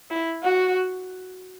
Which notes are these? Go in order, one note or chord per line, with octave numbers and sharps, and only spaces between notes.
E4
F#4